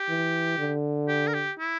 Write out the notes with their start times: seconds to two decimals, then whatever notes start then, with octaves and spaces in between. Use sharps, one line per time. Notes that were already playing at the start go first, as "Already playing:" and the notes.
Already playing: G4
0.09 E3
0.58 D3
1.08 G4
1.28 A#4
1.34 G4
1.59 E4